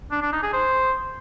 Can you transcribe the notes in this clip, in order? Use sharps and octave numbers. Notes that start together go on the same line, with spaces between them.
D4
D4
D#4
G#4
C5